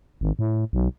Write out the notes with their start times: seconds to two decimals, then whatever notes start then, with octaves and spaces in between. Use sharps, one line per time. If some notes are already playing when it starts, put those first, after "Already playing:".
0.21 G#1
0.39 A2
0.73 B1